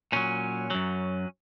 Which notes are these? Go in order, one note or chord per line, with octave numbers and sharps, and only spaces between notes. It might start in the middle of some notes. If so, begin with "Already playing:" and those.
A#2 F#3 C#4
F#2 F#3